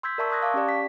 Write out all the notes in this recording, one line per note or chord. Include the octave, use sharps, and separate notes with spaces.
C6 E6 G6 G#6 B6
A#4 D5 E5 A5 C#6 E6
C6 C#6 D#6 F#6 G#6 A#6
F5 A5 C#6 D6
C#4 G4 D5
B6